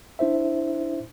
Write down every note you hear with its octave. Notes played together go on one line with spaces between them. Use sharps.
D4 E4 C5 E5